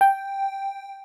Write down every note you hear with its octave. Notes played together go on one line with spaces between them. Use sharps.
G5